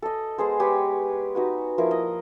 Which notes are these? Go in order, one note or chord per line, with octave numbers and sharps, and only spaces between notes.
A4 D#5
G#3 B3 G#4 C5
G#3 G4 B4 C#5
D#4 F#4 B4
F3 A#3 E4 A#4
D#5